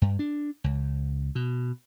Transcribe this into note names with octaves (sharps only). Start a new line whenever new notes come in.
G2
D4
C#2
B2